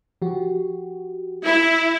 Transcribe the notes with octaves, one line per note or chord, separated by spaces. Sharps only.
F3 F#4 G4
E4